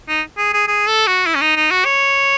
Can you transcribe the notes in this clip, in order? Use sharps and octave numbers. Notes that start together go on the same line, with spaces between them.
D#4
G#4
G#4
G#4
A4
F#4
E4
C#4
D#4
D#4
F#4
C#5